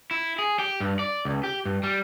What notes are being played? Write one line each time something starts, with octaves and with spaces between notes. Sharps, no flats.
E4
G#4
G4
G2
D5
C#2
G4
G2
G3